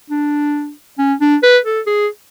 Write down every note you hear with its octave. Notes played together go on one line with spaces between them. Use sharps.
D4
C#4
D4
B4
A4
G#4